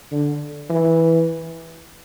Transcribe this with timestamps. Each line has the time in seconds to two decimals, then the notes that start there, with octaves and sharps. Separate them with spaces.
0.12 D3
0.70 E3